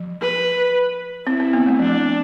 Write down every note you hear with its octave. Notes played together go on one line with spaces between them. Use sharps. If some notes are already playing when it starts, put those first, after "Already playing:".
Already playing: F3
B4
C4 E4
C4
B3
A3
F3 D4